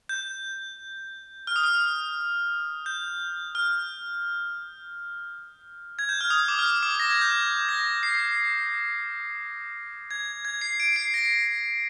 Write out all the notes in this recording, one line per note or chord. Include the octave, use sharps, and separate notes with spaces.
G6
F6
D#6
F6
G6
F6
G#6
G6
F6
D#6
D6
F6
D#6
D6
A#6
G#6
G6
G#6
A#6
C7
G#6
G#6
C7
D7
C7
A#6